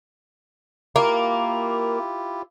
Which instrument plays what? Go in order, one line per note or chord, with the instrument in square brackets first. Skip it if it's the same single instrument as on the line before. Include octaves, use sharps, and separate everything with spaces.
[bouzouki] A#3 [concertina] E4 F4 G4